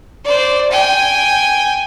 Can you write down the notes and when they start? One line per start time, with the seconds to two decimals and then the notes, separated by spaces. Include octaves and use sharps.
0.24 C5 D5
0.71 G5 G#5